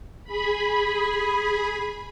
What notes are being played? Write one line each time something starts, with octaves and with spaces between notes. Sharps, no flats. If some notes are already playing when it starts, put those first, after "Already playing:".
G#4 B5